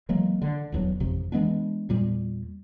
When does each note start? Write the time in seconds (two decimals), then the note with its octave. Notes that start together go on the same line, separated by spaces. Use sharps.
0.09 E3 F#3 G#3 A#3
0.42 D3
0.72 D#1 E2 F#3
1.00 G#1 F2 C3 F3
1.32 E3 G#3 B3 D4
1.89 E2 A#2 G3